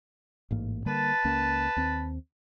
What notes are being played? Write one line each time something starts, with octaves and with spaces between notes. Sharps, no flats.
A1 G#2 A#3
D3 G3 A#3 B4 A5
C#2 A#3 C#4
D#2 C4